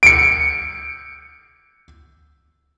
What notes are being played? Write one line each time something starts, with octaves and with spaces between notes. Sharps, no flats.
C#7 D7